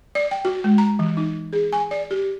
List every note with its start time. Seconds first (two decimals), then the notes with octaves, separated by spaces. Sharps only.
0.15 D5
0.31 G5
0.45 F#4
0.64 G#3
0.78 A#5
0.99 E3
1.17 D#4
1.53 G#4
1.73 G#5
1.91 D5
2.11 G4